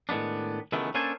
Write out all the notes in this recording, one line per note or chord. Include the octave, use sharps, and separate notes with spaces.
A2 D#3 G#3 B3 D4
C#2 D#3 E3 G#3 A3 B3
A#3 C#4 D4 A4 C5 G#5